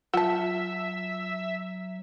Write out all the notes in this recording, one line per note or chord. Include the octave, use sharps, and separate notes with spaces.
F#3 F4 E5 F#5 A5